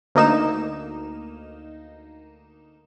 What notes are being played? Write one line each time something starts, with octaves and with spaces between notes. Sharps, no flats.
D2 A#3 D#4 E7